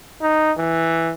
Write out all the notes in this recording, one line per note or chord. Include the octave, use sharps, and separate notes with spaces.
D#4
E3